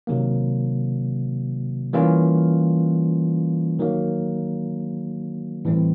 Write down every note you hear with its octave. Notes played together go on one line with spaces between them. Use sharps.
C3 D#3 F#3 A#3
E3 G3 A#3 C#4 F4
D#3 F#3 A#3
A2 E3 G3 C4